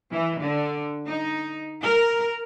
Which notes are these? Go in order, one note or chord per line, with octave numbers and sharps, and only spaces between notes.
E3
D3
D#4
A#4